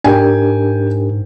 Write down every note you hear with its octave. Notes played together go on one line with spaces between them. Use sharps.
G#2 D4 G4 A#4 G5 G#5